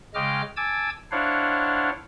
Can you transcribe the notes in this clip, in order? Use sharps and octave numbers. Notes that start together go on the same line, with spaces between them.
C#3 G#3 D#5 G5 D6 F6
G#5 A5 D6 E6 G#6
D4 E4 C5 C#5 F5 F#5